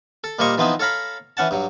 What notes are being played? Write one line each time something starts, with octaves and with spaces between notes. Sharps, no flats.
A4
A#2 G3 A#3 C5 D#5 C#6
E3 F3 B3 C4 D#4 E4
A4 C#5 F5 A#5 B5
E3 C#4 F#5 A5
G2 F#3